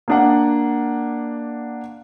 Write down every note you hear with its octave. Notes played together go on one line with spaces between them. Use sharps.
A#3 D4 F#5